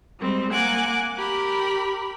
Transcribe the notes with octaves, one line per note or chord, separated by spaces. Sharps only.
G3 G#3 C4
A#3 F#5 G#5 D6 F#6
G4 A#4 B5